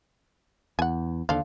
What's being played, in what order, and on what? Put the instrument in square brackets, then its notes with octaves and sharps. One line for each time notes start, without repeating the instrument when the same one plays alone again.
[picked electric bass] E2 [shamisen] F#5 G#5
[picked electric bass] D#2 D3 [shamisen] F3 F5